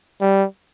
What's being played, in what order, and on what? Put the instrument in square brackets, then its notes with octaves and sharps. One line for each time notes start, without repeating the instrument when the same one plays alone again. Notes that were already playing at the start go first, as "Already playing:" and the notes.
[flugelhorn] G3